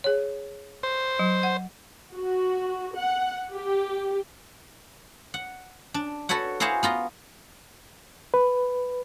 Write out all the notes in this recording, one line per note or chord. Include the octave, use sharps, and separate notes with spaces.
G#4 C#5
C5
F#3
F#5
F#4
F#5
G4
F#5
D4
F#4 A4 B4 C#5 F#5
E4 F#4 G#4 C5 F5 F#5
B3 F4 A#5
B4